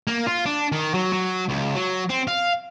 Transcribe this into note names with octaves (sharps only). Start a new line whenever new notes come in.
A#3
F4
D4
D#3
F#3
F#3
C#2
F#3
C4
F5